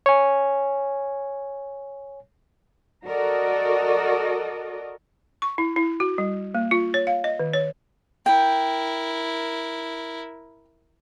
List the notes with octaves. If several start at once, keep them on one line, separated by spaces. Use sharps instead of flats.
C#5 G#5
F#4 A4 A#4 D5 D#5
C#6
E4
E4
F#4
G3
A#3
F4
C#5
F5
D#5
D#3
C#5
E4 A#4 G5